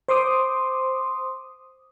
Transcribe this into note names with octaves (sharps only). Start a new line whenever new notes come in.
C5 C6 D6 D#6